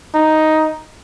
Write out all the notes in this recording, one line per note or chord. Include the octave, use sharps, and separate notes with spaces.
D#4